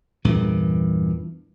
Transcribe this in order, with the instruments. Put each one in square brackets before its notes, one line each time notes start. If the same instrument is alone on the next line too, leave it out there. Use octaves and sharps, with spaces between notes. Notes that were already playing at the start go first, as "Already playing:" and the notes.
[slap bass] E2 G2 A#2 E3